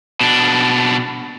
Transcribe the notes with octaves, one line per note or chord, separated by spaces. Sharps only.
B2 D4